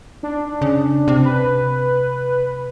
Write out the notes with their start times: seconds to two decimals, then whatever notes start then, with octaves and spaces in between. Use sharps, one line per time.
0.23 D4
0.62 C#3
1.08 C3
1.25 B4